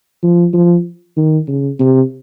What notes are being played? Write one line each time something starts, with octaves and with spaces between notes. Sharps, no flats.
F3
F3
D#3
C#3
C3